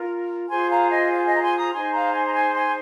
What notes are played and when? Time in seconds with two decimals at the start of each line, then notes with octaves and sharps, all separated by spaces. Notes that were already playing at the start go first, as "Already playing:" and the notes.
Already playing: F4 A#4
0.49 F4 G#4 C5 G#5 C6
0.70 F5 A#5
0.90 D#5 G#5
1.11 F5
1.26 D#5 G#5
1.35 A#5
1.41 G#5 C6
1.57 A#5 D#6
1.73 D#4 G#4 C5 G#5 C6
1.93 F5 A#5
2.13 G#5 C6
2.26 A#5
2.34 G#5 C6
2.54 G#5 C6